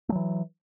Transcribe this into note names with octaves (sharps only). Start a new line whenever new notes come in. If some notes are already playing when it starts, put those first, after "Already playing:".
E3 F#3 A3